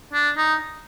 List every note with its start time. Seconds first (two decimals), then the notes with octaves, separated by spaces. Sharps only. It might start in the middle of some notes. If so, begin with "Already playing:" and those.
0.13 D4
0.37 D#4